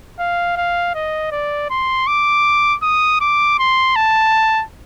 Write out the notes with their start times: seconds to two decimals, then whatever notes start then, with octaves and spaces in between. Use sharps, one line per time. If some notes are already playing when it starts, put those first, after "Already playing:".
0.20 F5
0.57 F5
0.95 D#5
1.32 D5
1.70 C6
2.07 D6
2.83 D#6
3.21 D6
3.59 C6
3.96 A5